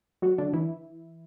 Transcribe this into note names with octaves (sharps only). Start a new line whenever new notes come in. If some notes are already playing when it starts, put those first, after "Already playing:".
F#3 F#4
D3 D4
E3 E4